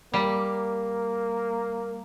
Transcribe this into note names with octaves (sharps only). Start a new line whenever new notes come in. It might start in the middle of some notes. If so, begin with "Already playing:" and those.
G3 A#3